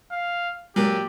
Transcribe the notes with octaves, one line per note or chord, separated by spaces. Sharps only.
F5
A#2 F#3 G4